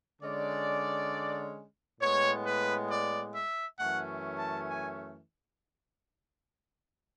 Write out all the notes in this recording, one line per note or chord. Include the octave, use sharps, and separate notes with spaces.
D3 G#3 C#4 D5
A2 G#3 B3 C#5
B4
D5
E5
F#2 E3 A3 C#4 F#5
A5
G#5